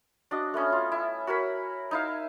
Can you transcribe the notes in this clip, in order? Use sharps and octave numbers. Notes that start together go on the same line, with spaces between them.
D4 F#4 D#5
A3 B3 C#4
F4
E4
F#4 A#4 C#5 B5
D#4 E4 F5